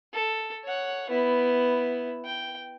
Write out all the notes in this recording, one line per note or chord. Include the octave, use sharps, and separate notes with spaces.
A4
C#5 F#5
B3 E4
G5